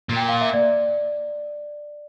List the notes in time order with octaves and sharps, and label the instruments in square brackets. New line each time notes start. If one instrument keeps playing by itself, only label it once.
[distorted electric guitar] A#2
[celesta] G5
F5
E5
D5